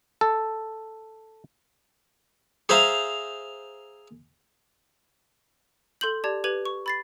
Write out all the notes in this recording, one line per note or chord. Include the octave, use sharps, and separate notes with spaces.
A4
G#4 C5 E5 F5 A#5
A4 C6 G6 F#7
G4 D5 A5 G#6
G4 B4 G#6 D#7 F#7
C#6
B5 A6 C7